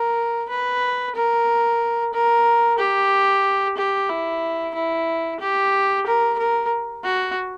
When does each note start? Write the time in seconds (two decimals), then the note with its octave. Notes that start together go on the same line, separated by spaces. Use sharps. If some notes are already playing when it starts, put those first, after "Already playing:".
Already playing: A#4
0.50 B4
1.15 A#4
2.14 A#4
2.79 G4
3.78 G4
4.10 E4
4.75 E4
5.40 G4
6.06 A#4
6.38 A#4
7.04 F#4